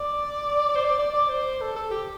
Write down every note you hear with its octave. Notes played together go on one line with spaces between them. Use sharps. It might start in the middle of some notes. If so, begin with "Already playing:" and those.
Already playing: D5
D5
C5
D5
D5
D5
C5
A4
A4
G4